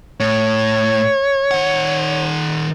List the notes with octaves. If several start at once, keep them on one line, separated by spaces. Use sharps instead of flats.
A2 C#5
D#3 F#5